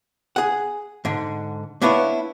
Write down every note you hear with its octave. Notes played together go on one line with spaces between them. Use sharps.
G#4 F#5
G#2 D3
A#3 B3 D4 E4 B4 C#5